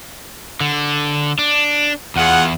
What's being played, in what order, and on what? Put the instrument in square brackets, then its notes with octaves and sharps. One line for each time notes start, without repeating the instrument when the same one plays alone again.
[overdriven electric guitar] D3
D4
[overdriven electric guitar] E2 [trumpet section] F4 G#4 F#5